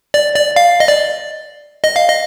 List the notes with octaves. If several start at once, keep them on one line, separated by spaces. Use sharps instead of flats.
D5
D5
F5
D#5
D5
D#5
F5
D#5